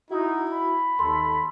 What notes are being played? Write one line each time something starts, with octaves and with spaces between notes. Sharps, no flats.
D#4 E4 F#4
B5
D#2 A4 C6